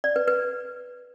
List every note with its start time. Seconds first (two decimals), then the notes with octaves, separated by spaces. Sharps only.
0.04 D5
0.16 B4
0.28 B4